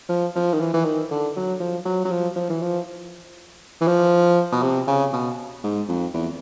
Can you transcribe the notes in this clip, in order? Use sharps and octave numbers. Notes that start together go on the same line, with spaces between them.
F3
F3
D#3
E3
E3
D#3
D3
F#3
F3
F#3
F#3
F3
F3
E3
F3
E3
F3
B2
C3
C#3
B2
G#2
F2
E2